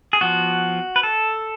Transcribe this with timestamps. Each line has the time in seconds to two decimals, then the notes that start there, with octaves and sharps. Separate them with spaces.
0.13 G#4
0.21 F3 B3 F#4
0.96 B4
1.03 A4